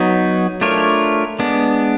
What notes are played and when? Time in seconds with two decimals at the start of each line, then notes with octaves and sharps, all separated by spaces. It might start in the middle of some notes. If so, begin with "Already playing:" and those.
Already playing: F#3 B3 D#4
0.61 A3 D4 F4 A#4 C#5
1.39 G#3 B3 D4